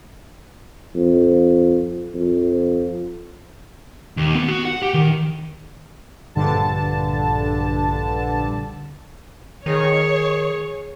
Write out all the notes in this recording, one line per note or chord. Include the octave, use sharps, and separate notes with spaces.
F2
F2
D#2
B3
F#4
F#5
G4
D#3
A#1 G2 D3 A5
D#3 G#4 C#5